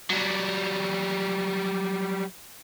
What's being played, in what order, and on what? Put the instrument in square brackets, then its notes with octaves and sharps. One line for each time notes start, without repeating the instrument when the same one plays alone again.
[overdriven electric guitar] F#3 G3